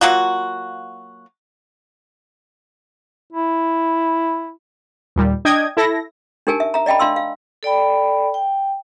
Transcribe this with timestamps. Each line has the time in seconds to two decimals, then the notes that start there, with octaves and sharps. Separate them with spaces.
0.01 F#3 A#3 F4 F#4
3.33 E4
5.16 D#2 A#2 G3
5.45 D4 D#5 G5 D#6 G#6
5.77 E4 A4 A#6
6.47 D4 D#4 G4 A#4 G#5 A5
6.60 E5
6.74 E5 A#5
6.86 D5 D#5 G5 A5 B5
7.00 D4 F5 C6 E6
7.16 F5
7.63 A4 D5 G5 B5
8.34 G5